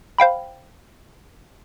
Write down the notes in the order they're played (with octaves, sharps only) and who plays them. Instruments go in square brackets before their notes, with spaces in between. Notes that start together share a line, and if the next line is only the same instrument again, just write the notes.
[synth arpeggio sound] C5 F5 G5 B5